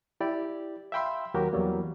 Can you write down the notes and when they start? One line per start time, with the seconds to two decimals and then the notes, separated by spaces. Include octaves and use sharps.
0.21 E4 G4 D5
0.92 E5 F5 G5 B5 C6 E6
1.34 D#2 F#3 F#4 G4 A#4
1.53 E2 F#3 G3 A#3